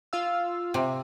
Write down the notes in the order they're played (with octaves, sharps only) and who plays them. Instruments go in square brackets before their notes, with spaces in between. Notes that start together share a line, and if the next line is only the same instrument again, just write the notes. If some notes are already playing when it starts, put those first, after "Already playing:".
[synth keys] F4 F5 E6
[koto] C3